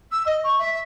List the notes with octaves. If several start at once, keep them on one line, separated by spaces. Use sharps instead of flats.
E6
D#5
C#6
E5